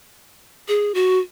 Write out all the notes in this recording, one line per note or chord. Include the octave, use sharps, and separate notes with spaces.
G#4
F#4